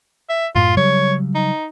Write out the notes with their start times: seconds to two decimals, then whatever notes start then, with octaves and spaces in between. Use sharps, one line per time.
0.30 E5
0.55 F#2 A2 F4
0.77 C#3 F#3 G3 C#5
1.35 D#4